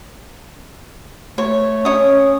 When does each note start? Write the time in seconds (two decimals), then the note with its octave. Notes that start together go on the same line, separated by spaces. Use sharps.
1.38 A3 C#5
1.85 C#4 C#5 D#6